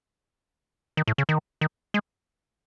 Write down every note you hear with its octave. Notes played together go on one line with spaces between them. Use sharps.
D#3
A2
C#3
D#3
D#3
G#3